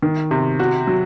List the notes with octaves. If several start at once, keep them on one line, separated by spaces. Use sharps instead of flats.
D#3
C3
F#4
F#3